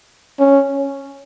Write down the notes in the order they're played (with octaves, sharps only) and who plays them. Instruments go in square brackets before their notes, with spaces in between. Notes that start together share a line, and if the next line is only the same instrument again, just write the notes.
[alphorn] C#4